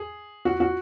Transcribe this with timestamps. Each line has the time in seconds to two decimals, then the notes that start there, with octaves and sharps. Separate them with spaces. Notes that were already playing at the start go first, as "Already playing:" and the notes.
Already playing: G#4
0.45 F#4
0.60 F#4